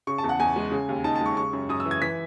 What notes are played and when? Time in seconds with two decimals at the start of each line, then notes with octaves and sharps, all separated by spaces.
0.07 C#3 C#6
0.18 A5
0.24 E2
0.29 F#5
0.40 E2 G#5
0.56 G#3
0.71 C#3
0.89 D#2
1.04 D#4 A5
1.16 A5
1.21 G#3 C#6
1.37 C#3 C#6
1.53 F#2
1.69 F#2 D#6
1.80 E6
1.85 E3
1.91 G#6
2.02 E3 B6